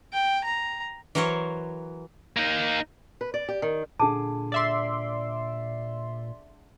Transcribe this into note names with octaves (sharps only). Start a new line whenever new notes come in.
G5
A#5
E3 F#3 A#4 C5 C#5
A#3 D#4
B4
D5
G4
D#3
A#2 D3 G#4 A5 D6
D5 E5 C6